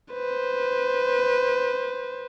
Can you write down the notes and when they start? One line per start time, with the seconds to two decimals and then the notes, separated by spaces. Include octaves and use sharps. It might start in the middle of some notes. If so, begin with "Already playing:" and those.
0.13 B4 C5